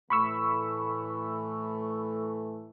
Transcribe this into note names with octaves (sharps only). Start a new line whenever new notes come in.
A2 E3 A3 B5 C#6 E6